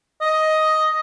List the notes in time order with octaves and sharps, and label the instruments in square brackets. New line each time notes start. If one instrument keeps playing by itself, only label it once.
[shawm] D#5